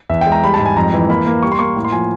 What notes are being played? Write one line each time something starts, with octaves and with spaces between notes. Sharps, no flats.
E2 E5
G#3 G5
A#5
G3 B5
A5
G#2
G#5
F2 A#5
E3
A#3 B5
A#3
G3 C#6
C6
A#3 C#6
A2
C6
F3 G#5